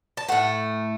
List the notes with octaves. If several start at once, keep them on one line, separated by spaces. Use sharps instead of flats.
A5
A2 A3 F#5